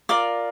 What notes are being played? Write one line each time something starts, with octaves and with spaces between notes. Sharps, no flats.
F4 A#4 D5 D6